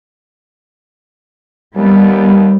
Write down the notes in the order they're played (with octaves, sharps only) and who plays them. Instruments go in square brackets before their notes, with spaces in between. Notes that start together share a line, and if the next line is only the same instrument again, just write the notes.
[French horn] D#2 [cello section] G3 B3